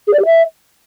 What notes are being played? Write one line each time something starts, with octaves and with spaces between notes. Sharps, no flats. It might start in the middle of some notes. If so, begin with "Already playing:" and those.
G#4
D5
G4
E5